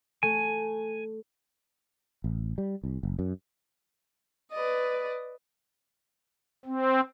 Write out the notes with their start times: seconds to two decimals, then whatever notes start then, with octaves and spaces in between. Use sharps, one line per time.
0.23 A3 G#5
2.24 A1
2.58 G3
2.84 C2
3.03 F#1
3.19 F#2
4.52 B4 D5 D#5
6.65 C4